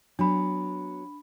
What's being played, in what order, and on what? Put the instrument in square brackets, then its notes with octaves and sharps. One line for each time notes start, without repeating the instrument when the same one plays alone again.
[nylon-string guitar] F#3 B3 [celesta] D4 B5